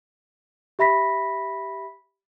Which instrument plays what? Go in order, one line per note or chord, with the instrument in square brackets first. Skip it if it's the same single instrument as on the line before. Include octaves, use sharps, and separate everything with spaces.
[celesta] G4 E5 B5 A#6 B6